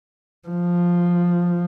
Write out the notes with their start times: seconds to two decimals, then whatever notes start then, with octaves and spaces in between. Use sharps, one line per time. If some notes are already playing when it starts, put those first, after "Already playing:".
0.48 F3